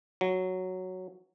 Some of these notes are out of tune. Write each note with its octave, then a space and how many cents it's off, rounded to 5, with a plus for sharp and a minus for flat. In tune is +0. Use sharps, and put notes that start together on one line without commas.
F#3 +0